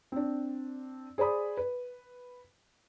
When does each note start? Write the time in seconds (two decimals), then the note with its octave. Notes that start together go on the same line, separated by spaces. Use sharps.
0.12 C4 D4
1.18 G#4 C5 D5 B5 D#6
1.57 B4